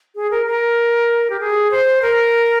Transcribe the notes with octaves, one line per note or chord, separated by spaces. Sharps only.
G#4
A#4
A#4
G4
G#4
C5
A#4